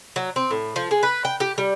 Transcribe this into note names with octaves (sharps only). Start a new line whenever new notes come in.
F#3
C4
A2
F3
G#3
B4
G5
G4
G3